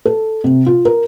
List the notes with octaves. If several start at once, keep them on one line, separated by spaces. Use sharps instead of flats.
A4
C3
F4
A#4